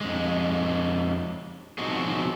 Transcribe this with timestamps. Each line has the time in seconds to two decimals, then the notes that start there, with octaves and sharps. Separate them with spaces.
0.01 F2 G#3
1.78 B2 F3 C4 D#4 F#4 G#4